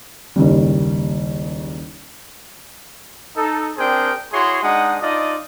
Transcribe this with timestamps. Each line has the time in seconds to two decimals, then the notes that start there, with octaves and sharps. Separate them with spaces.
0.36 F#1 D#2 G3
3.36 D#4 A4
3.78 C4 D4 G#4 A#4 C5 G5
4.32 E4 F#4 G#4 C#5 C6
4.63 G#3 D4 D#4 F#5 D#6
5.02 D4 D#4 F4 D5 D#5